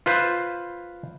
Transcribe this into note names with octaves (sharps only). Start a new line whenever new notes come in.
F4 B4 C5